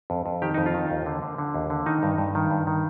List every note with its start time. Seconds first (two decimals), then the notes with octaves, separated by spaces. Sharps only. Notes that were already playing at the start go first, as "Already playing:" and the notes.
0.10 F2
0.26 F2
0.42 D#3 G4
0.54 F2 D#4
0.66 F4
0.74 D#3
0.90 D#2
1.06 D3
1.22 D3
1.38 D3
1.54 D#2
1.70 D3
1.86 D#3 D#4
2.03 G2
2.18 G2
2.35 D#3
2.51 G2
2.67 D#3